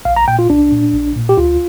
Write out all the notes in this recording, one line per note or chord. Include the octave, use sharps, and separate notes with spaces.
A#1 F5
A#5
A#2 G5
F4
C2 D4
A#2
A#1
A#2
G4
D2 F4